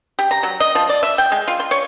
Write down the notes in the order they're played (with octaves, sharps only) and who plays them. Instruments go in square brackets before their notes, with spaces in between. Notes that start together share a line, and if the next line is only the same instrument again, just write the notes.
[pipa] G4
A#5
F#3
D#5
F3
D5
E5
G5
G#3
F4
C6
C#5